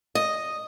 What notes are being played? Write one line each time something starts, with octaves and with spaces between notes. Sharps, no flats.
D#5